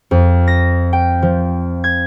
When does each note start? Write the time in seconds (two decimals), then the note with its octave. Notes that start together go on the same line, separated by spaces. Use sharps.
0.11 F2
0.48 A#6
0.93 G5
1.22 F3
1.84 G#6